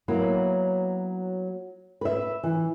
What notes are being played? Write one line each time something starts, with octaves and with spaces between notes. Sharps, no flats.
F#3 A#3 B3 E4
B4 E5
E3